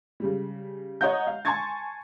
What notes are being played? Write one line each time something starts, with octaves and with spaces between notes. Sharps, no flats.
C#3 G3
C#5 D#5 F#5 A#5 G6
F5
G#5 A5 C6 C#6 G#6 A6